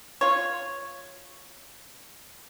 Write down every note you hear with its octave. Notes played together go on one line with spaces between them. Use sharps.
F4 C#5